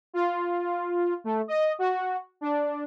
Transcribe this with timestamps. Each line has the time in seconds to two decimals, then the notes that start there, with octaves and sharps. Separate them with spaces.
0.14 F4
1.24 A3
1.48 D#5
1.79 F#4
2.41 D4